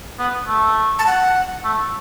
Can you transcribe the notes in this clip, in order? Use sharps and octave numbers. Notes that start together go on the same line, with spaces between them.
B3
A3
A5
F#5
A3